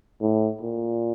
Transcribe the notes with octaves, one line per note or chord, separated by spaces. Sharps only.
A2
A#2